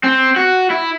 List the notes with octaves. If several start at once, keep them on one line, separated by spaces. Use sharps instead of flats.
C4
F#4
E4